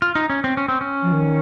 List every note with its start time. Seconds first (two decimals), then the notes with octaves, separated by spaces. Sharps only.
0.02 F4
0.15 D#4
0.30 C#4
0.44 C4
0.57 C#4
0.68 C4
0.81 C#4
1.02 F3
1.12 D#3